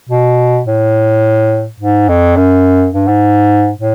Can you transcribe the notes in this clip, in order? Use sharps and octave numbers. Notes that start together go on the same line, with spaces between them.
B2
A2
G#2
F2
F#2
G2
G#2
A2